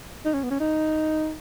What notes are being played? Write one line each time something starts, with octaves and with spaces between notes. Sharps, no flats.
D#4
C#4
B3
C#4
D#4